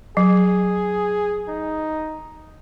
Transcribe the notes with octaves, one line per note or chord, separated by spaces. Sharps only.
F#3 G#4
D#4